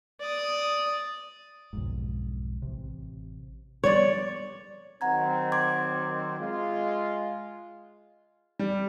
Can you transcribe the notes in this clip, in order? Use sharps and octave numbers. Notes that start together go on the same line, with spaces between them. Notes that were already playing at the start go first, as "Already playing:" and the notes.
D5 D#6
B1 F2 G#2
A1 C3
F3 G3 B3 C#5 D5
D#3 F#3 C4 F#5 A#5 G#6
C6 D6 G#6
G#3 F4
G3